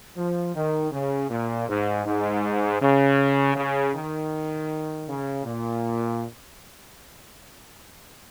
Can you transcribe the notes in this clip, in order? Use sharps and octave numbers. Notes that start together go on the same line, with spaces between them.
F3
D#3
C#3
A#2
G#2
G#2
C#3
C#3
D#3
C#3
A#2